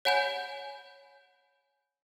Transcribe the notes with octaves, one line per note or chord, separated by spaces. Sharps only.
C#5 F#5 G#5 B5 G6